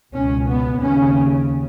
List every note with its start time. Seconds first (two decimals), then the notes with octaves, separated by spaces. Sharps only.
0.14 C#2 B2 C#4
0.49 B3
0.83 D#2 C#3 C#4